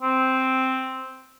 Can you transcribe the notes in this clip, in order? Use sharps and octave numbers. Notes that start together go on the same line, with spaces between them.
C4